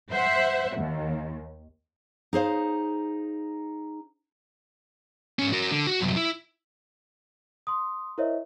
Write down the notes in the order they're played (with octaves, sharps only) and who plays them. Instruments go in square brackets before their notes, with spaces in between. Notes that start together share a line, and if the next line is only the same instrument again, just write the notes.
[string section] C5 E5 F#5
D#2
[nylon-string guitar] D#4 G#4 C5 F5
[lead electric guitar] G#2 C#4
F#4 A#4
D3
F#4
C2 F#2
E4
[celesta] C6 D#6
E4 A#4 C5 C#5 D#5 E5